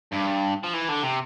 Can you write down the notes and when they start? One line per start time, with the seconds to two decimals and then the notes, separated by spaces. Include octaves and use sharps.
0.13 G2
0.63 F3
0.73 E3
0.88 D3
1.02 C3